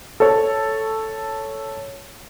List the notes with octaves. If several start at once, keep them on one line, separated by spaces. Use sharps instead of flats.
A4 C#5